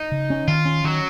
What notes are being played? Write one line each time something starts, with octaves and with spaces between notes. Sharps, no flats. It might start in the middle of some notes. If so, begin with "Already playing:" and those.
Already playing: D#4
C#3
C#4
D#3 F4
C#4
D#3 F#3